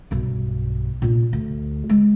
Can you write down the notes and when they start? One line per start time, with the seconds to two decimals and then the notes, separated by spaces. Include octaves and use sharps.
0.11 B1 G2
1.02 A#2 D4
1.33 D2
1.90 G#3